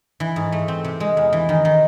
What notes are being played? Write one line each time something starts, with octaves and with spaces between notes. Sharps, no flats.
E3
G#2
A3
C4
C3
G#3
E2
E3
D#3
D#3